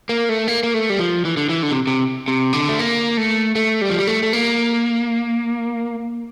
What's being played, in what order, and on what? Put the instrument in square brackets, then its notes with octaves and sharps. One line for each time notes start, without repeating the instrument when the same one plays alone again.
[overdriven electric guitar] A#3
A3
A#3
A#3
A3
G3
F3
E3
D3
E3
D3
C3
C3
C3
D3
A3
A#3
A3
A3
G3
F3
G3
A3
A3
A#3